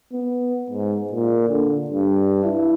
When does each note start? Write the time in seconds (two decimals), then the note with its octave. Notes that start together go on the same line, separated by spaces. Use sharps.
0.13 B3
0.70 G#2
1.13 A#2
1.48 D3
1.90 G2
2.44 E4